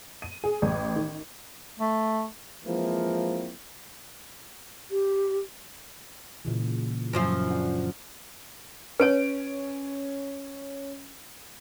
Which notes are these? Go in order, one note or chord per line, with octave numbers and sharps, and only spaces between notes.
D#7
G#4
A1
D#3
A3
E3 F3 G#3 A#3 C4 E4
G4
A#2 C#3 E3
F#2 F3 F4
D4 F#5
C#4 B4 C#5 D7